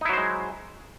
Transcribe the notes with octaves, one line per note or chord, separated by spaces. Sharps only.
F#3 G#3 D#4 E4 C5